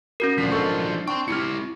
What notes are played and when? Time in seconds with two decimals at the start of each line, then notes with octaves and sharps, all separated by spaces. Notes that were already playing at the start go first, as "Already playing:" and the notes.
0.20 C#4 F#4 A#4
0.38 D2 F3 D4 B6
0.52 G#2 A4 C#6
1.08 D4 G5 C6 C#6
1.28 E4 G4 F6 C#7